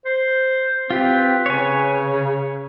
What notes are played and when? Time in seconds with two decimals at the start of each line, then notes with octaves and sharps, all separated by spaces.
0.05 C5
0.90 C4 F4 G4 B4
1.46 C#3 C#5 G#5